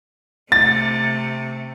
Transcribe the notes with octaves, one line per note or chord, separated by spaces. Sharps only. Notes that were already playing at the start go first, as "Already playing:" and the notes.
C3 A3 A6